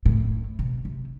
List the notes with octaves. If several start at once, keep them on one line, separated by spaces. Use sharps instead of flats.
A2
B2
C3